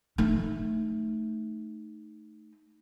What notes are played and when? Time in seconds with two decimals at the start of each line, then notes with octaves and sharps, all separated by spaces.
0.18 A3 D#4